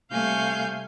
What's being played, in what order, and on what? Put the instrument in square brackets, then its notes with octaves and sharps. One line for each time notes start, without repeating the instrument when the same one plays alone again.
[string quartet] C3 G3 A3 F5 G#5 G6